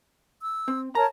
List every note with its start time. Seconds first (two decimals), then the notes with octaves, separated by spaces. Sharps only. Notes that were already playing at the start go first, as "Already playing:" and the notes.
0.40 E6
0.68 C4
0.95 A#4 C#5 A5 A#5